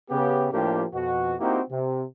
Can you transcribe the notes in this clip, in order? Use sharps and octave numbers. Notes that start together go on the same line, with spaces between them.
C#3 B3 G4
A2 F3 A#3 D4 G4
F2 B2 F#4
A#3 C4 D#4 E4 F#4 G4
C3